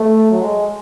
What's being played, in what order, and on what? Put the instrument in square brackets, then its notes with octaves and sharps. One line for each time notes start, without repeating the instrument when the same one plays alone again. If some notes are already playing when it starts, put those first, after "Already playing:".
Already playing: [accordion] A3
F#3
G#3